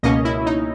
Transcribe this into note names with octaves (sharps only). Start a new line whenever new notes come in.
C#2 B2 A#3 C#4 D#5
E4
D#4